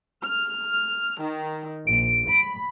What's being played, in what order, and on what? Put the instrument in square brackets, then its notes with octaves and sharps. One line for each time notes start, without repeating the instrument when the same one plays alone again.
[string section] F6
D#3
[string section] A#1 [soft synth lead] D7
[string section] B5